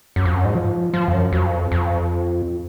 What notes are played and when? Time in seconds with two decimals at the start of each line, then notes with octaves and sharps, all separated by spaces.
0.16 F#2
0.25 F2
0.35 F#2
0.45 G#2
0.55 F3
0.94 F3
1.08 F2
1.14 F#2
1.33 F2
1.72 F2